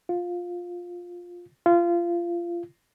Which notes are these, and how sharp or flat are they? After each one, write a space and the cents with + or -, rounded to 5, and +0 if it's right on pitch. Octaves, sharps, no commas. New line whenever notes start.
F4 +10
F4 -25